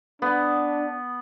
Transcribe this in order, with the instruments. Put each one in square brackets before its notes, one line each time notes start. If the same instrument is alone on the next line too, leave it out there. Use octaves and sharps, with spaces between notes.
[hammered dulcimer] B3 [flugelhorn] D4